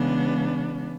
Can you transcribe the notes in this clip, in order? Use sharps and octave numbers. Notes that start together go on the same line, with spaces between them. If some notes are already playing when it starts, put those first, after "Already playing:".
Already playing: C#3 E3 G#3 B3 D4